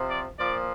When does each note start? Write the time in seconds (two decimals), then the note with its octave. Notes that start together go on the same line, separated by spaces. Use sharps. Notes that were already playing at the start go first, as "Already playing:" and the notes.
Already playing: C3 F3
0.09 D5
0.38 A#2 F3 D5